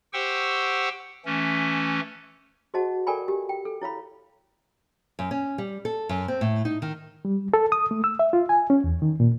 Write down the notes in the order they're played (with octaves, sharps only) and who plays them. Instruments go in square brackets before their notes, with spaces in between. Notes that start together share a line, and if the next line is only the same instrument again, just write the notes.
[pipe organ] G4 C5 F#5 G5 C#6 E6
E3 A3 C#4
[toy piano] F#4 G#4 C5 D#5 F#5 A5
A4 A#4 D5 G5 G#5 B5
G4
G5
A4
E4 C#5 F5 B5
[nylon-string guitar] F#2
C#4
G3
A4
F#2
C4
A2
D#4
D#3
[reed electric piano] G3
A4
D#6
A3
E6
E5
F4
G#5
C#4
E2
D#3
A#2